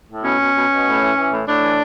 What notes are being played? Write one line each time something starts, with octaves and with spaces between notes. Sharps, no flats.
A2
B2 C#4
B2
B2
B2
A2
E3
E3
A2
A2 D4
E3